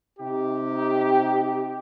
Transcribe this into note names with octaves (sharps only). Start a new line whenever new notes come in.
C3 D#4 G4